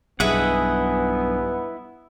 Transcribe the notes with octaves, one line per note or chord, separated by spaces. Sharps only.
B1 G2 B3 E4 G#4 D#5 E5 F#5